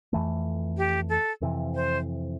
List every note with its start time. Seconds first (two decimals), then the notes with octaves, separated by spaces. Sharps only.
0.13 F2 E3 A3
0.78 G4
1.09 A4
1.41 F2 C3 E3
1.75 C5